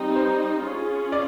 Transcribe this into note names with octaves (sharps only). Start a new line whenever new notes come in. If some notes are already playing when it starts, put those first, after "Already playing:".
Already playing: G3 C4 D#4
C5
C#4 F4 G#4
D5